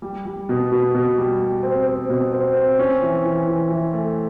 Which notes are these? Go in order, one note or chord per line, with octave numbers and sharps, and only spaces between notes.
G3
G3
B2
B2
B2
G3
G3
C4
C4
B2
C4
C4
C#4
E3
E3
E3
E3
A3